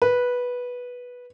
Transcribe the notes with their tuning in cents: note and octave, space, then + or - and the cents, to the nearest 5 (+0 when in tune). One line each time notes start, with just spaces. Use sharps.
B4 -10